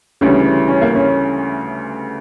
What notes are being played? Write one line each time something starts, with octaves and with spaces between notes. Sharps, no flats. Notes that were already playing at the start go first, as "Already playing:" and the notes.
D2 C#3 E3 G3 C#4
C#4
A#3
C#4